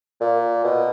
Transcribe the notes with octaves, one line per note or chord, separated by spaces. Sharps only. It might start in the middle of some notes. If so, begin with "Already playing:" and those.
A#2
B2